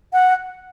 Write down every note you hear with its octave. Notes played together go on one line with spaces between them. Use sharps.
F#5